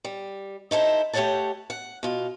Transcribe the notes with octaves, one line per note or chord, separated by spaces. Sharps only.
G3
D#4 E4 A4 C5
A3 G4 A4 C#5 F#5 A5
F#5
B2 F4